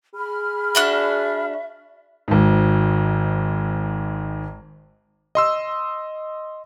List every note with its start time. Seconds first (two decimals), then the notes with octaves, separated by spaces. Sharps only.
0.15 G#4 B5 F6
0.75 D4 F#4 E5 F#6
2.28 G#1 G#2
5.35 D#5 C6 E6